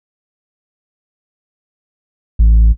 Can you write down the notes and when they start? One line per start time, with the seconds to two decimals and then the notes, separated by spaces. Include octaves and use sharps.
2.39 A1